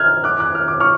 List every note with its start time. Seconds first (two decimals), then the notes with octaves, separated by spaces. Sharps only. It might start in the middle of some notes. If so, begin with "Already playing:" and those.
Already playing: F6 F#6 G#6
0.24 D6 F#6
0.39 D6 F#6
0.55 F6
0.68 D6
0.80 C#6 F6